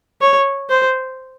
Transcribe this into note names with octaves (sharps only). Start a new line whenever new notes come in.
C#5
C5